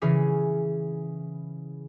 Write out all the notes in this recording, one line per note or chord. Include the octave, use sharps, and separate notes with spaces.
C#3 E3 C#4 G#4